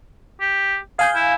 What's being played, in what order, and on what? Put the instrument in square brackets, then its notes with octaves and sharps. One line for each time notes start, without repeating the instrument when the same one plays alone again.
[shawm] G4
[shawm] G#4 [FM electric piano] F5 G#5 G6
[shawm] E4